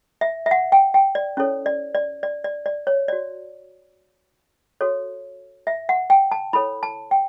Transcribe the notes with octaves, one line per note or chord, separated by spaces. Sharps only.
E5
E5
F#5
G5
G5
D5
C#4 E4 A4 C#5
D5
D5
D5
D5
D5
C#5
F#4 C#5 D5
F#4 A4 C#5
E5
F#5
G5
A5
E4 A4 C#5 B5
A5
G5